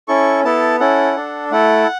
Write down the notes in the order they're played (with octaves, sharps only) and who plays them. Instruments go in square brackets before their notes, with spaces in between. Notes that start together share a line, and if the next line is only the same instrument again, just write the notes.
[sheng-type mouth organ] C#4 E4 A4 C#6
B3 E4 A4 A5
C#4 E4 A4 F#5
D4 A4
A3 E4 A4 F#5